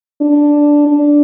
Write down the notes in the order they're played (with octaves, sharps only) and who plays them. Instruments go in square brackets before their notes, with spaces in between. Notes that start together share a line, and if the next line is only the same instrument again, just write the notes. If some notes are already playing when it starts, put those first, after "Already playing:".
[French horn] D4
D4